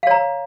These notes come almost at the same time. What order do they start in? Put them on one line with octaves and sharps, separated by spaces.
F5 C#5 A#5